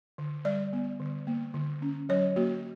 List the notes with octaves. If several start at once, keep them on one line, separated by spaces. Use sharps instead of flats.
D3
G3 D5
B3
D3
A#3
D3
C#4
F#3 C#5
A#3 F#4